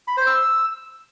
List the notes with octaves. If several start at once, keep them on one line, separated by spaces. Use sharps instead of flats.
B5
C5
E6